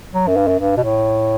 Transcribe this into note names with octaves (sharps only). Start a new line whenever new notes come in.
F#3
F#2
G2
F#2
G2
B2
A2